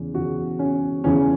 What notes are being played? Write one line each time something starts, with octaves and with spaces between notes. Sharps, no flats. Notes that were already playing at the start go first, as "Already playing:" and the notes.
Already playing: E2 C#3
E2 C#3 E3 F#4
C#4
E2 C#3 E3 C#4